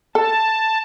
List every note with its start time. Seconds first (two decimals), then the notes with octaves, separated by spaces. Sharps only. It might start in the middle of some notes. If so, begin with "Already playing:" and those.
0.15 A4 A5